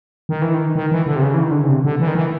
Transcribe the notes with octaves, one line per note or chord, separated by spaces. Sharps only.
D#3
E3
D#3
D#3
E3
D3
C3
C#3
E3
D#3
D3
C#3
C3
D3
E3
D#3
E3